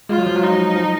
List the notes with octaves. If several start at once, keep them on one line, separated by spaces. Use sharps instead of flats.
G#3 F4
F#3
F3
F#3
D#4
F3